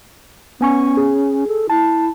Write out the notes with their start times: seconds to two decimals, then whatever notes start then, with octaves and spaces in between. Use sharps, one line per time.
0.61 B3 C#4 G#5 C#6
0.97 G#4
1.47 A4
1.69 E4 A5